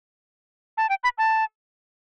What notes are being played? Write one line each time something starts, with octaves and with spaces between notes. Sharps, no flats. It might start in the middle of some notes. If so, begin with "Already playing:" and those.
A5
G5
B5
A5